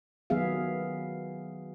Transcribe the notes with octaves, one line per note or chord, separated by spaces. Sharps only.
D#3 F#3 B3 G#4 E5 F5